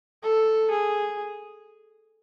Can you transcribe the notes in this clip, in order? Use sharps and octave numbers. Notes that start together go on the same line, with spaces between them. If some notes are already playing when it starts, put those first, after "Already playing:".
A4
G#4